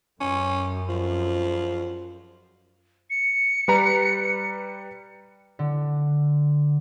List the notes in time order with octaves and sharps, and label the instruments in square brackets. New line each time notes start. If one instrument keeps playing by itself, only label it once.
[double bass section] F#2 [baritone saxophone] C#4
[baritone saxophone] F3
[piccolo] C#7
[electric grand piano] G3 B4 A#5
[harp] D3